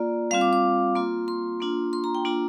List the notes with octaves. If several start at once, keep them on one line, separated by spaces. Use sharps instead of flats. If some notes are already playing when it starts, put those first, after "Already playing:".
Already playing: A#3 F4 D5
G3 C4 F4 F5
D6
D6
A#3 F4 C6
C6
A#3 D4 F4
C6
A#5
G5
A#3 D4 F4 A#5